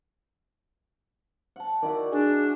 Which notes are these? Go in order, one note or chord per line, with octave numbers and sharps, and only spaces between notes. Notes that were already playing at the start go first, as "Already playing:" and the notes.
F#5 A5
D#3 E4 F#4 D5
D4 G#4